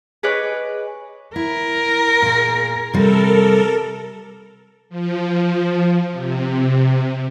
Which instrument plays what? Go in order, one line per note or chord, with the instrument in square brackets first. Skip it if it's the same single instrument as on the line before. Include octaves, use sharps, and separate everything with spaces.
[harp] G#4 B4 C#5 D#5 D6 F#6
[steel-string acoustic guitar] E4 [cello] A#4
[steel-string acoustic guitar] A#2 G#4
[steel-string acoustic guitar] C3 G3 [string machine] A4 A#4
[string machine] F3
C3